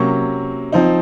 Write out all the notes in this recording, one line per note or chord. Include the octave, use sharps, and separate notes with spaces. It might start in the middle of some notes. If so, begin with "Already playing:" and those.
Already playing: C3 F#3 A#3 C#4 C#6
F3 C4 D#4